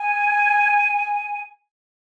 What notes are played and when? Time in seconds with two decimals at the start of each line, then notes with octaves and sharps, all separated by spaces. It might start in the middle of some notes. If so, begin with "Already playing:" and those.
Already playing: G#5